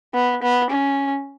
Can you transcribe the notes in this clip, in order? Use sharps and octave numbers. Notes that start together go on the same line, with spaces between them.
B3
B3
C#4